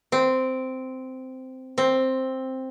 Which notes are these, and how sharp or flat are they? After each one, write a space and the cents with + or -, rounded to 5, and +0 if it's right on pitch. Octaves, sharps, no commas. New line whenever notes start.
C4 -10
C4 +5